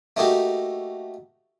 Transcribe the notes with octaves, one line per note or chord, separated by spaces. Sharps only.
A3 A#3 D#4 F#4 G4